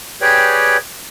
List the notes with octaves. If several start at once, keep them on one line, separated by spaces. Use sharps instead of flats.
G4 G#4 B4 C#5 D5 G5